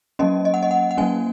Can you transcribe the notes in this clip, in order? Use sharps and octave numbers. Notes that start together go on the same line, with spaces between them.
F#3 A#3 C#4 D#5
D#5
F#5
D#5
F#5
F#5
F#3 A#3 C#4 G#5